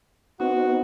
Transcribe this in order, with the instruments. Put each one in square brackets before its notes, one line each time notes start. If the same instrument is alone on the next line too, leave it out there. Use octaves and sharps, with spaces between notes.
[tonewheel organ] B3 C4 D#4 [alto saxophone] F#4